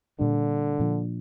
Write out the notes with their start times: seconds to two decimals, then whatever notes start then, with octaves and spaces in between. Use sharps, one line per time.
0.19 A#2 D3 G3 D4
0.80 A#2 F3 D4